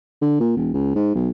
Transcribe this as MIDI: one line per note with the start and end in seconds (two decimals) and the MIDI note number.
0.22 0.39 50
0.40 0.53 46
0.57 0.73 28
0.74 0.95 37
0.95 1.12 44
1.15 1.29 35